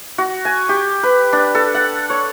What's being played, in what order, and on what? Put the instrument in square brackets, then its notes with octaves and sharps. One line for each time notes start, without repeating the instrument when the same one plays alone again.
[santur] F#4
G#5
G4
B4
D4
A4
F#5
C#5